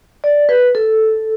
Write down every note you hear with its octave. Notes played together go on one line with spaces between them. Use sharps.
D5
B4
A4